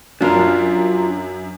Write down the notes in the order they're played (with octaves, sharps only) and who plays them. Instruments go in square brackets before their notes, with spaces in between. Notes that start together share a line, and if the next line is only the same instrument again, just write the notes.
[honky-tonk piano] F#2 F#3 [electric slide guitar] D4 F4 A#4